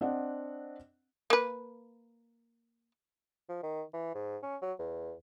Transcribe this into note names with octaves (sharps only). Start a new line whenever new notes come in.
C4 D4 D#5 F#5
A#3 B4
F3
D#3
E3
G#2
C#4
F#3
E2